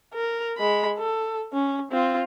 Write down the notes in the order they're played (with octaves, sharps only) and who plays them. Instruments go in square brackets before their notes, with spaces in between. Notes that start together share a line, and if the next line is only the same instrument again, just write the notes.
[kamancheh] A#4
G#3 B5
A4
C#4
C4 F4